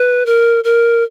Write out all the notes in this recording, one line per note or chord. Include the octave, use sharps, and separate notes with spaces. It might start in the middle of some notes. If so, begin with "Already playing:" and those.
Already playing: B4
A#4
A#4